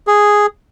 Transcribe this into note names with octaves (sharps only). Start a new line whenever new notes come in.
G#4